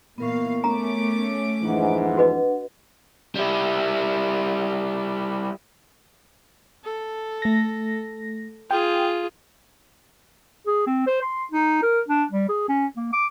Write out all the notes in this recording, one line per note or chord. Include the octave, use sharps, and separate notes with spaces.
A#2 E3 B3 A#4 F5 C#6
A3 C#4 A#5 D6
F2 G#2 E3 D4 F#5
F#4 B4 D#5
G3 E4
A4
A3 A#6
F4 G#4 G5
G#4
C4
C5
C6
D#4
A#4
D4
G3
G#4
C#4
A#3
D6